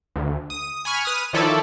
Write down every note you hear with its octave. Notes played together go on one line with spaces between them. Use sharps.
D2
D#6
G#5 B5 C#6 F6
B4 D#6 F6
D#3 F3 E4 A4 C#5 D5